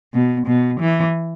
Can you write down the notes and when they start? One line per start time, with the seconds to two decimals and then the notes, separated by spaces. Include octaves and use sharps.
0.14 B2
0.47 B2
0.80 E3